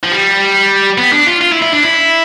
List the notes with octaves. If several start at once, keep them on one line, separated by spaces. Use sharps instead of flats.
F3
G3
B3
D4
F4
F4
E4
E4
D4
E4